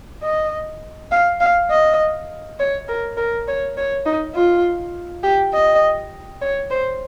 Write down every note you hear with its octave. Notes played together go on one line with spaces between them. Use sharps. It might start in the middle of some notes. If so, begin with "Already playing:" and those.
D#5
F5
F5
D#5
C#5
A#4
A#4
C#5
C#5
D#4
F4
G4
D#5
C#5
C5